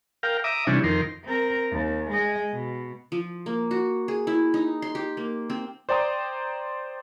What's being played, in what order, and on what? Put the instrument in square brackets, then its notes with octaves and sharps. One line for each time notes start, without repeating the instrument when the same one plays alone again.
[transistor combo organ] A#4 F5 G5
E5 A#5 D6 D#6
C3 E3 G3 C#4 D4
F2 D#3 A#4 C6
[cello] C4 A#4
D#2
G#3 D#5
B2
[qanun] F3
A#3
F#4
G#4
E4
D#4
C6
G4
A#3
C4
[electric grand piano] C5 D5 G5 A#5 D#6